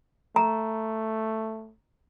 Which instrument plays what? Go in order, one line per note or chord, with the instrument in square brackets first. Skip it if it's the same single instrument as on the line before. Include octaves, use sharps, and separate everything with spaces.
[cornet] A3 [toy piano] A#5